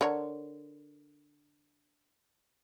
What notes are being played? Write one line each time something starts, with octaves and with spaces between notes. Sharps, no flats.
D3 A#4 C#5